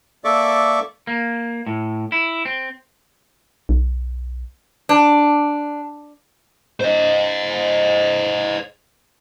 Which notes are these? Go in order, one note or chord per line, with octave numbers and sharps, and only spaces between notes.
A#3 A4 D5 E5 C#6 D6
A#3
A2
E4
C4
B1
D4
C5 D#5